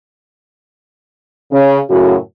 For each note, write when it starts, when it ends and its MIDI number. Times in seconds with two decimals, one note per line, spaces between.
1.52 1.79 49
1.90 2.16 42
1.90 2.16 45
1.90 2.16 49
1.90 2.16 66